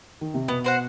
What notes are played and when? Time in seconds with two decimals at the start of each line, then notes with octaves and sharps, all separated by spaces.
0.21 D#3
0.34 C3
0.48 B2 B3
0.64 F#4 C5 F#5